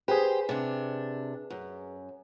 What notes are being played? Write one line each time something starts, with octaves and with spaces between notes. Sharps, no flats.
G4 G#4 B4 C5
C3 D4
F#2